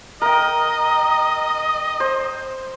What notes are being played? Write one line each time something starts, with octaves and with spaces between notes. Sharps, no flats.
A#4 D#5 G5
C5